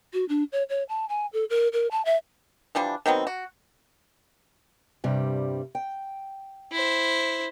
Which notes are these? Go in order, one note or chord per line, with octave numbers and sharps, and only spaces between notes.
F#4
D4
C#5
C#5
A5
G#5
A4
A#4
A#4
A5
E5
E3 F3 G3 D4
D#3 F#3 B3 C4
F#4
G2 C3 G3
G5
E4 C5